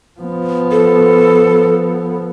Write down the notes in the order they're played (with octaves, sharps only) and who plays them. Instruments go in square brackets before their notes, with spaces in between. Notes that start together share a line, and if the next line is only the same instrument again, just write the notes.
[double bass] F3 B3
[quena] A4